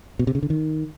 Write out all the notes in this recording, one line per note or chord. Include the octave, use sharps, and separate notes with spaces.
B2
C3
C#3
D3
D#3